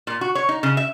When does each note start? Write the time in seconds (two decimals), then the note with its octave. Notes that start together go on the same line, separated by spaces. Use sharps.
0.07 A#2
0.21 F#4
0.35 C#5
0.49 D#4
0.63 C#3
0.77 E5